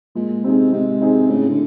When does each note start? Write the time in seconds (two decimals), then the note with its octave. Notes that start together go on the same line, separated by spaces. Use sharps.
0.15 A#2 G#3
0.44 C3 C4 D#4 G#4
0.72 C3 G#3
1.01 C4 D#4 G#4
1.30 A2 C#3
1.49 D3